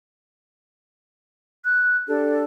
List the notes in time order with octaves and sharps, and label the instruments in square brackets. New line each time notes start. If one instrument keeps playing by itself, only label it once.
[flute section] F#6
D4 G4 A4